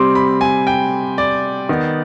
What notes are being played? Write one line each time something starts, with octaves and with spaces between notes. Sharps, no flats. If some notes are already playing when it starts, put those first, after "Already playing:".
Already playing: C3 G3 C4 C6 D6
B5
G#5
G5
D5
D#3 B3